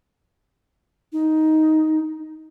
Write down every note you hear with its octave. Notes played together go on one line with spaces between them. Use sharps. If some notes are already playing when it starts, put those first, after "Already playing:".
D#4